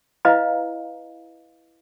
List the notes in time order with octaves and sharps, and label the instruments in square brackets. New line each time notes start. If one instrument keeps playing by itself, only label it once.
[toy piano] E4 B4 D#5 F5 A#5